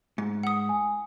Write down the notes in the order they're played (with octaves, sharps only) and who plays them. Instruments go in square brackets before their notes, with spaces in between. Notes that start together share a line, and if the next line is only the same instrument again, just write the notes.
[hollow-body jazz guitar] G#2
[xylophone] F#5 D#6
[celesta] G#5